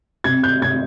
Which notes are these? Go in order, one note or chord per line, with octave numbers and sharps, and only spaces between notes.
C3 G#6
G6
C3 G#6